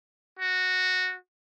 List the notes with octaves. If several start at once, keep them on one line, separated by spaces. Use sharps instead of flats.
F#4